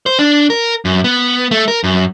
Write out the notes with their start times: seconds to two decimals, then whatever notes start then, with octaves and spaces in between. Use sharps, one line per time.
0.06 C5
0.19 D4
0.50 A#4
0.85 F#2
1.04 B3
1.51 A3
1.68 A#4
1.84 F#2